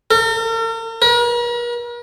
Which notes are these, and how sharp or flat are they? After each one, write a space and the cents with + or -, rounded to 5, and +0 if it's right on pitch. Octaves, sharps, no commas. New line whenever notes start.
A#4 -45
A#4 +45